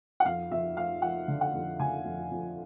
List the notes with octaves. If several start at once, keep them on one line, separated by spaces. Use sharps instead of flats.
F#5
F2 F5
F2 E5
F3 F5
F3 F#5
D3
F#5
F2
D3 G#5
F2
F2